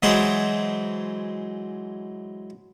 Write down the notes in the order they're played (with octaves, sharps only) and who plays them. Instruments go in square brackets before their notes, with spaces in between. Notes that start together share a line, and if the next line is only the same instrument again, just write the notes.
[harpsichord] E3 F#3 G#3 D#4 G#4 C5